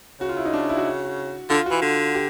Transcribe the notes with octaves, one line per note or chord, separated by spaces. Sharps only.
C#3 F#4
F4
E4
D#4
D4
E4
F#4
D3 F4
F#4
E3
D3
G4